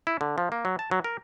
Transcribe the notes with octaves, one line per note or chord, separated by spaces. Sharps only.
E4
D3
F3
A#3
F#3
A5
F#3
A#4